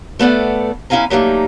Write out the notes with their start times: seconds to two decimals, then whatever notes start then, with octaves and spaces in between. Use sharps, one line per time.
0.19 A3 B3 A4 D5 F#5
0.90 B3 C#4 E4 F5 G#5 A#5
1.10 F#3 G3 A3 A#3 D#4